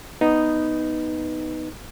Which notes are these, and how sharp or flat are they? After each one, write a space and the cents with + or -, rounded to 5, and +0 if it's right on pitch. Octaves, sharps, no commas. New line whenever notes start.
B3 +0 D#4 +0 B4 +0